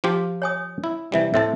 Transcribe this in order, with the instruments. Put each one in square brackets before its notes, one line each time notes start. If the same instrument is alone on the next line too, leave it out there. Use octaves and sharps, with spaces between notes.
[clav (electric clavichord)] F3 F4 G4
[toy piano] C#5 G#5 D#6
[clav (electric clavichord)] E4
[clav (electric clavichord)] C3 E3 G3 [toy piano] E5 G5
[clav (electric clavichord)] A2 C4 A5 [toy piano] E5